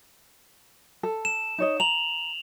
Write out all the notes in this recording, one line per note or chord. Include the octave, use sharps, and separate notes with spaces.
A4
E7
D#4 C#5 D#5
A#5 F7 F#7